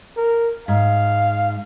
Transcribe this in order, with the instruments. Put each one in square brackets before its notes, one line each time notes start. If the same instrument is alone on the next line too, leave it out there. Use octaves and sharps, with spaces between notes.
[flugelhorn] A#4
[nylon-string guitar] G#2 [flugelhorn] F5